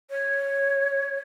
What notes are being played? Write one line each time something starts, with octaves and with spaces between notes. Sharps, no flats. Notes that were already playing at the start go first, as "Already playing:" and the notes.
C#5